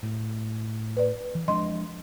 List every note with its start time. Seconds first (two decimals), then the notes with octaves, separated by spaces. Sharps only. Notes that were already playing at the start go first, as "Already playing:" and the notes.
0.03 A2
0.97 B4 D5
1.35 E3
1.48 F3 G#3 D4 D#5 C6